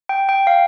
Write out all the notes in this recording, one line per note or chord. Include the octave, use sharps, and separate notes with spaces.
G5
G5
F5